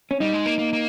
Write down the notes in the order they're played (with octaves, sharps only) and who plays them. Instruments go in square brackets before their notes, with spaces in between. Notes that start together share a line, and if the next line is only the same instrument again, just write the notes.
[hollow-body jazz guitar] C#4
[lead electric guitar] G3 [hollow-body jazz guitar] D#4
[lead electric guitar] G#3
A#3
A#3
A#3